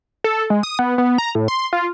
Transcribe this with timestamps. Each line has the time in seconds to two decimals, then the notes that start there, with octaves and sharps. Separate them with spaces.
0.24 A4
0.50 G#3
0.63 D#6
0.79 B3
0.98 B3
1.18 A#5
1.35 A2
1.48 C6
1.73 F4